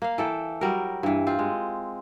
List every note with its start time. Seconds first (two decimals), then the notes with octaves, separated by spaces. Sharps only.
0.02 A#3 F5
0.18 E3 A4 G5
0.61 F#3 G3 A#4
1.03 G2 E3
1.27 C4 F4
1.39 G#3